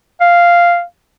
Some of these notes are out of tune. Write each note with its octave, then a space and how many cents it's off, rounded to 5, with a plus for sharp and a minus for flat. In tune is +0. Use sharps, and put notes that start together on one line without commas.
F5 -5